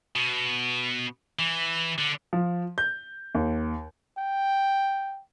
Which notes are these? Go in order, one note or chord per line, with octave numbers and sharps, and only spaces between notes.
B2
E3
D3
F3
G6
D#2
G5